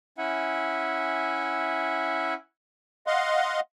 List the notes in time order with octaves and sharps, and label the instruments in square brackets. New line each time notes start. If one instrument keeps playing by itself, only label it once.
[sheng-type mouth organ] C#4 E4 E5 F#5 G#5
[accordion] D#5 F5 F#5 C6